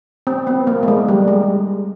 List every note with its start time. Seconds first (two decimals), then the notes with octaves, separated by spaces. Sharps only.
0.27 C4
0.47 B3
0.67 A#3
0.83 A3
0.88 G#3
1.08 G3
1.28 G#3